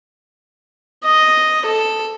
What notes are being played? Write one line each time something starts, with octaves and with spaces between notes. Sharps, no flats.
D#5
A4